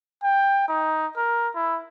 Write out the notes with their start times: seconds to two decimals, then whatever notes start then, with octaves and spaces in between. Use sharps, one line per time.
0.23 G5
0.68 D#4
1.16 A#4
1.55 E4